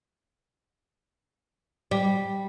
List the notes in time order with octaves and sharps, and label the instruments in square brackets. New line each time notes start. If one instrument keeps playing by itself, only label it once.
[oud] G3